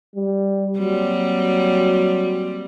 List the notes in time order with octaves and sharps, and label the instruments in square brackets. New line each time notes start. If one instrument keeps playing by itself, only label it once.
[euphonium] G3
[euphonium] F#3 [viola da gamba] G3 A#3 C4